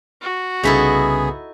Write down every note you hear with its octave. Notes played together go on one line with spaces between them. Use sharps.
F#4
C2 C#3 B3 D#4 E4 G#4 A4 B6